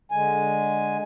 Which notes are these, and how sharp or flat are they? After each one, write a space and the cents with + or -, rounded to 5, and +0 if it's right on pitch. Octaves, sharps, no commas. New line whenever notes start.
D3 +0 G#3 +0 G#5 +0